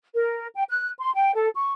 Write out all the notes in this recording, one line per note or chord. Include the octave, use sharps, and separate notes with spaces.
A#4
G5
F#6
C6
G5
A4
C#6